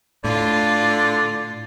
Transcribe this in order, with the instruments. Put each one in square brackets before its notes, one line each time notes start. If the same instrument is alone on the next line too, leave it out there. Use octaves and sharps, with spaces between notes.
[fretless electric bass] A2 [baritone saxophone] D3 [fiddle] F4 [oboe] D5